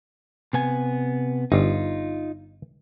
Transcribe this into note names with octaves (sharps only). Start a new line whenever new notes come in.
C3 B3 G#5
G1 D#4 F4